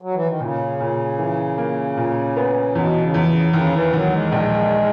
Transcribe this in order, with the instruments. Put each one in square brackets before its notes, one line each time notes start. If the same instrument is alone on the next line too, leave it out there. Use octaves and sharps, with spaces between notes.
[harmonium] F#3
E3
D#3
[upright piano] A#2 [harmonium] C#3
[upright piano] A#2
E3
A#3
A#2
B3
[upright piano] E2 [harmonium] B2
[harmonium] C#3
[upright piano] E2
[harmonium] C#3
[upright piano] D#2 [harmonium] C#3
[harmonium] E3
[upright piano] D#2 [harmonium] F#3
[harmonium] G#3
[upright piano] A#1